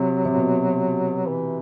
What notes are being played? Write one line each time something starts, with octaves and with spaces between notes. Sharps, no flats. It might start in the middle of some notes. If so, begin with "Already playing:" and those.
Already playing: C3 F#3
C3
B2
E3